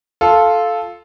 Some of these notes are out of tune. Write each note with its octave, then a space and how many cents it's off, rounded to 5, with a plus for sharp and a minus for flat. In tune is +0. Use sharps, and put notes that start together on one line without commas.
F4 +0 A4 -10